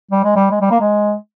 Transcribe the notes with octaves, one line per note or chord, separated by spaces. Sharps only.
G3
G#3
G3
G#3
G3
A#3
G#3